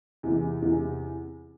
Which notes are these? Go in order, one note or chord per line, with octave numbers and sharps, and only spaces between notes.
E2 C3 E3
E2 C3 E3